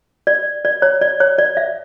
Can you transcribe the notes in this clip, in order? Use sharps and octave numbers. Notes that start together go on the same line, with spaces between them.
D5
D5
C#5
D5
C#5
D5
E5